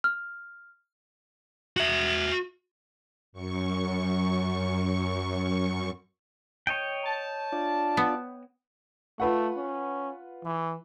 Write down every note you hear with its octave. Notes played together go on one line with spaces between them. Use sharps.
F6
F#4 E5
F#2 C#6
C#5 D#5 G5
A5
D4 F4 D5
B3
A3 F4 B4 F#5
C#4
E3